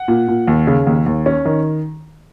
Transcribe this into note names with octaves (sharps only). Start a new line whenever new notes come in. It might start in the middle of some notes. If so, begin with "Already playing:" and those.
Already playing: F#5
A#2
A#2
D#2
C#3
D#2
D#2
C#4
D#3